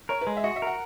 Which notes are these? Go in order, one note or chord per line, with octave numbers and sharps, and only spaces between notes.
A#4 C#5
B4
G#3
E5
F#4 D#5
E5
A#4 F#5